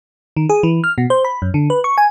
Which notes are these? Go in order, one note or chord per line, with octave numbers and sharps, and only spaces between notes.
D#3
G#4
E3
F6
B2
C5
B5
F#2
D3
B4
C#6
G#5